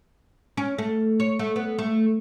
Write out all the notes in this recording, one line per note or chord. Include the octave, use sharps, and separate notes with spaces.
C#4
A3
C#5
A3
B3
A3